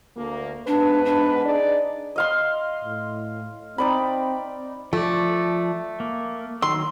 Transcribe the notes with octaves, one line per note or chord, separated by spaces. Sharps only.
D2 A#3
G#2 B3 D4 B4
D4
D#4 G#4 D5
D#5 F5 C6
A2
C4 D#4 D5 B5
F3 A3 D5
A#3
D#3 F#3 C6 E6